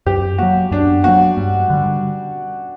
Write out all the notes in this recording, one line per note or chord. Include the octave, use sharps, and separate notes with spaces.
F#2 G4
F#3 A#3 F#4
F#2 D4
F#3 A#3 F#4
G2
D3 G3